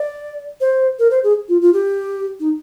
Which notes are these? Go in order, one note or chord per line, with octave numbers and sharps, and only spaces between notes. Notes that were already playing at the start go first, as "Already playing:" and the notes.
Already playing: D5
C5
A#4
C5
G#4
F4
F4
G4
D#4